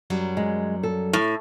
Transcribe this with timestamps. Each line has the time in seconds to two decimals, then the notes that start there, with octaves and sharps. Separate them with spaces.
0.10 F#2 F#3 G3
0.37 G#3
0.83 A4
1.13 A2